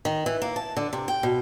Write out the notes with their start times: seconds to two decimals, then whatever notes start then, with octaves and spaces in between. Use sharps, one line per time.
0.05 D#3
0.26 E3
0.42 A#3
0.56 A5
0.77 D3
0.93 C3
1.08 G5
1.23 B2